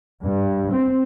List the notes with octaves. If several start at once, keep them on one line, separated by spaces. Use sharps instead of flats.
G2
C4